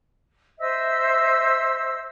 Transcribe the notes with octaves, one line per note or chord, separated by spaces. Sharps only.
C5 D#5 E5 E6